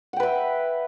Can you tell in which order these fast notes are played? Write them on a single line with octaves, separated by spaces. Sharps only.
F#5 G5 B4 E5